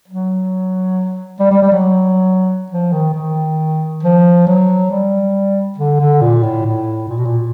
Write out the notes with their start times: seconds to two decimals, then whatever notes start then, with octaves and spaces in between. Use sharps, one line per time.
0.08 F#3
1.40 G3
1.51 G3
1.62 G3
1.73 F#3
2.72 F3
2.93 D#3
3.14 D#3
4.03 F3
4.47 F#3
4.91 G3
5.78 D3
6.00 D3
6.22 A#2
6.43 A2
6.66 A2
7.09 A#2
7.18 B2
7.26 A#2